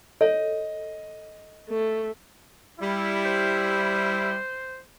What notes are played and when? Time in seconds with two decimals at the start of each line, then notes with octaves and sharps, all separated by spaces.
0.21 A4 C#5 D#5
1.69 A3
2.80 G3 E4
3.26 C5